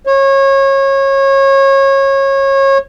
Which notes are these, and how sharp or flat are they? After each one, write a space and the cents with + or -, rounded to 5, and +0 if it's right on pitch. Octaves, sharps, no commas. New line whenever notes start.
C#5 -25